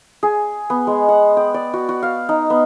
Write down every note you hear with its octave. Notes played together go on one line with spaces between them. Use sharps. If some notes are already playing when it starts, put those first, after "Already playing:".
G#4
B3
G#3
F#5
G5
D5
F#4
F#4
F5
D#4
B3